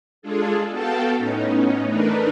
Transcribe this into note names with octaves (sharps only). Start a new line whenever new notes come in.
G#3 D4 F4 G#4 A4
B3 F#4 A4 F5 G5 A5
A2 B3 C#4 D#4
E3 A3 D4 D#4 A#4 B4